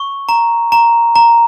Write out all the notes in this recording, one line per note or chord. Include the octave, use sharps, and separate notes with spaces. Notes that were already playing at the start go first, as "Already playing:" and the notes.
Already playing: C#6
A#5
A#5
A#5